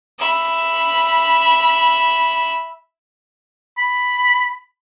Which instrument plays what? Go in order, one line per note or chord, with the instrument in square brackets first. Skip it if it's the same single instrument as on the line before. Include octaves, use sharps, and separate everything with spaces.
[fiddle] E5 B5
[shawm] B5